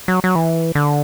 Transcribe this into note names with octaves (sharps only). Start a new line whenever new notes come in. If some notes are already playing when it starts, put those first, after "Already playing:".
F#3
F#3
E3
D3